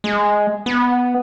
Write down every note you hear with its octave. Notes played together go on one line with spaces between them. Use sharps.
G#3
B3